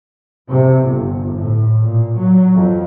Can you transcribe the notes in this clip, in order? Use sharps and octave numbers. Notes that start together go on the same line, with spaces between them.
C3
G1
A2
A#2
F#3
F2